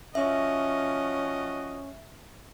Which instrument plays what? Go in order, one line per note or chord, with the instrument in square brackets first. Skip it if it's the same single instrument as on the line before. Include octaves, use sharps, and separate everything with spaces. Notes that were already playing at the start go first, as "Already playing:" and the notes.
[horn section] F3 F#4 D#5 [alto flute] C#4 [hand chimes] E5